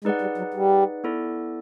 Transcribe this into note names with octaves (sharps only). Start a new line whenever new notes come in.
G#3 D#4 G#4 B4 D5 F#5
G3
F#3
G3
B3 E4 A4 D5